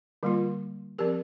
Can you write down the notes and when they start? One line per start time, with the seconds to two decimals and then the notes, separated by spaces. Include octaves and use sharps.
0.23 D3 G3 A#3 F4
0.99 F3 C4 G4 A#4